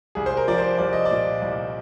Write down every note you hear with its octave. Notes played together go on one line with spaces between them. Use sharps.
C2 G#4
C5
A#4
F3 D5
C5
C2 D5
D#5
D5
A#2
C2